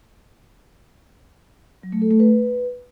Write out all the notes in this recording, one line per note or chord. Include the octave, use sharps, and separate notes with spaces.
F#3
A3
A4
A3
B4